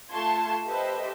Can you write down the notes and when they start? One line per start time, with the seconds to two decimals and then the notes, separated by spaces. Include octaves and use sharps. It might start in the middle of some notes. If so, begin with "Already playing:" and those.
0.11 A3 F4 A5 C6 C#6 G#6
0.67 G4 A4 B4 C5 D#5 E5